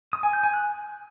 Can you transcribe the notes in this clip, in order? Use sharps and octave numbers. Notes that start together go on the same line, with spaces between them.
D#6
G#5
G6
G#5
F#6